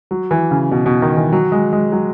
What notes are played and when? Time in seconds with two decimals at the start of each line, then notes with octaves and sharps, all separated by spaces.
0.11 F#3
0.31 E3
0.51 C#3
0.72 B2
0.86 B2
1.02 D#3
1.16 E3
1.32 F#3
1.52 G#3
1.73 G#3
1.92 F#3